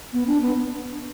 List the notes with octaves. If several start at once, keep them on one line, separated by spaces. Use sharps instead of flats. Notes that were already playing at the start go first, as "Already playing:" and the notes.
B3
D4
B3